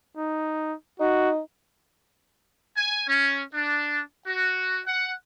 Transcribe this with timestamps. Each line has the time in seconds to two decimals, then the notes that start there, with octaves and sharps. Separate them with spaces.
0.18 D#4
1.00 D#4 F#4
2.77 G#5
3.08 C#4
3.54 D4
4.27 F#4
4.86 F#5